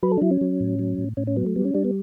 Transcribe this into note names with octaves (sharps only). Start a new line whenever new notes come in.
F#3 B4
A4
D4
F#3 E4
C#4
F#3
A2
F#3
A2
A2 C#4
C#4
F#3 B3
A3
G3 B3
C#4
G3 D4
B3